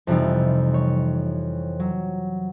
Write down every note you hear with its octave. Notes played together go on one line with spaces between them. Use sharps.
F2 C3 E3 G3 D#4
C#5
F#3